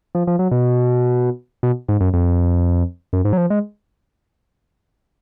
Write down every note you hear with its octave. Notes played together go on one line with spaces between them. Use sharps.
F3
F3
F#3
B2
B2
G#2
F#2
F2
F#2
G#2
F#3
F3
G#3